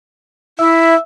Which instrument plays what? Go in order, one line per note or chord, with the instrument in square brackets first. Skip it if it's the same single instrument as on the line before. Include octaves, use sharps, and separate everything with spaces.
[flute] E4 [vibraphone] E5 E6